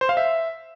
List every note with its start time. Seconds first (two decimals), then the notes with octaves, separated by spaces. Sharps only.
0.01 C5
0.09 F5
0.17 E5